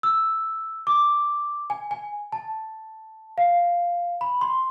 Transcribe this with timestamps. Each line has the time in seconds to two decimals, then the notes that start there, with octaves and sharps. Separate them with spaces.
0.03 E6
0.87 D6
1.70 G#5
1.91 G#5
2.32 A5
3.38 F5
4.21 B5
4.41 C6